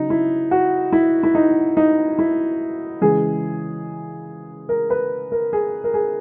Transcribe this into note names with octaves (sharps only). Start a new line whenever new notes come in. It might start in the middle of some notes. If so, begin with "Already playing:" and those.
Already playing: C#3 F#3 D#4
E4
F#4
E4
E4
D#4
D#4
E4
C#3 E3 G#3 G#4
A#4
B4
A#4
G#4
A#4
G#4